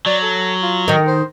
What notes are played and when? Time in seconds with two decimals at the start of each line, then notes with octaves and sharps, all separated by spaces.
0.06 F#3 D5
0.23 A4
0.63 F4
0.88 D#3 A#4 D#5
1.07 C5